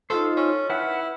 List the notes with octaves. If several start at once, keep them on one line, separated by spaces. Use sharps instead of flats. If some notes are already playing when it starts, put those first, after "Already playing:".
D#4 F4 A4 C5
C#4
E4 B4 F#5 F6